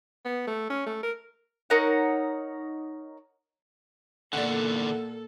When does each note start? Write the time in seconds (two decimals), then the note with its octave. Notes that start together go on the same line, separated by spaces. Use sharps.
0.25 B3
0.47 A3
0.70 C#4
0.86 A3
1.03 A#4
1.70 D#4 A#4 C#5 F#5
4.33 E2 A#2 D3 A4 D5 F#5